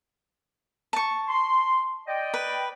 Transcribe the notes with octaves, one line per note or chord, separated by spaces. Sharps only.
A5 C#6
C6
D5 D#5 G5
B4